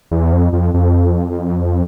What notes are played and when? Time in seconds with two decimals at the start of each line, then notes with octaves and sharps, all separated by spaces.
0.11 E2
0.32 F2
0.53 F2
0.74 F2